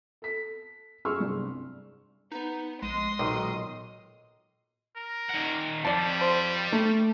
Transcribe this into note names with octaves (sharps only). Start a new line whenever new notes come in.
A4 B6
F#2 G#4 C6 C#6 E6 F6
C2 G2 C3
B3 D#4
A#1 G#3 C6 D#6
B1 A#2 D#3
A#4
D#3 F#5
F2 G3 D5 A5
C5
A3